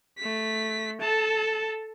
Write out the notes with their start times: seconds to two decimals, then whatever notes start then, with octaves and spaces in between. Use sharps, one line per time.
0.18 A3 B6
1.01 A4 A5